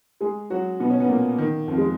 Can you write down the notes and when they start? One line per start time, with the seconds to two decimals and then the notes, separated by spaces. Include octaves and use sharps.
0.21 G#3 G#4
0.50 F#3 F#4
0.80 B2 B3
0.90 C#4
1.00 B3
1.09 A#2 A#3
1.38 D#3
1.68 F2 F3
1.78 G#3